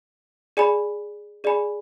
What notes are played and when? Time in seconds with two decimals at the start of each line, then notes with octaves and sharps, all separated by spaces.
0.57 G#4 D5 G#5 B5
1.44 G#4 D5 G#5 B5